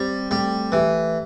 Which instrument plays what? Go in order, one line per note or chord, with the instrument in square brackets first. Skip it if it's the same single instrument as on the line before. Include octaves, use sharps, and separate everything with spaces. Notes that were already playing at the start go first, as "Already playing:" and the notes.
Already playing: [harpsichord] G3 [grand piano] C4 G4
[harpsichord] G3 [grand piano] A3
[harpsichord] E3 [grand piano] G4